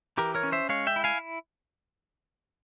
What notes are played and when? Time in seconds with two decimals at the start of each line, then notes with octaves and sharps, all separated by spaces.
0.18 E3 G4 A#4
0.35 A#4 C#5
0.43 C#4
0.52 C5 E5
0.69 G#3 C#5 F5
0.87 E5 G5
0.96 E4
1.04 F5 G#5